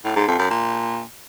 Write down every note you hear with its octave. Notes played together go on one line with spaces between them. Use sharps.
A2
G#2
F2
F#2
A#2